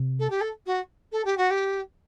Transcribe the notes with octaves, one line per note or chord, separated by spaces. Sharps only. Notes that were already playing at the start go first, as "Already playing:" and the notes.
Already playing: C3
A4
G4
A4
F#4
A4
G4
F#4
G4